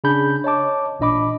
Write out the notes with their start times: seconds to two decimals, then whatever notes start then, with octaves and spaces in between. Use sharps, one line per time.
0.04 C#3 D4 G#4 B5 G6
0.44 C#5 D#5 A5 D6
1.00 A1 A#2 D4 D#5 B5 D6